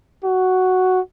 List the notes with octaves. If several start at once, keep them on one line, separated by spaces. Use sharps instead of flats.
F#4